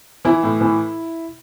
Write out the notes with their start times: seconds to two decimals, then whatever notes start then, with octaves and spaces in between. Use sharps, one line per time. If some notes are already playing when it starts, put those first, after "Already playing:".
0.25 E3 E4
0.43 A2
0.61 E3